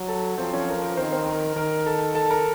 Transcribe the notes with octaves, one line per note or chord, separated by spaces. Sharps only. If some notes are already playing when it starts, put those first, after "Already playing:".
Already playing: F#3
A4 A5
F3 C4 C5
C#4 C#5
A#4
A#4
D#3 C4 C5
C4 C5
A#4
D#3 A#4
A4 A5
A4 A5
A#4 A#5